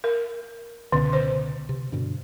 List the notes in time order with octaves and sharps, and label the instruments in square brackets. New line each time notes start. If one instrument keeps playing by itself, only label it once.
[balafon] A#4
[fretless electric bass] C#2 B2 [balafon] D3
[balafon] C5
[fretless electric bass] C3
G2 B2 D3